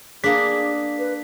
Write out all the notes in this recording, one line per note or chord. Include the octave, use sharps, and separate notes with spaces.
A#3 D4 G#4 B6
B4